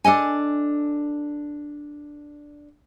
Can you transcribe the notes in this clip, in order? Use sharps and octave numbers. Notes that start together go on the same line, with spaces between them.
D4 A4 D#5 G#5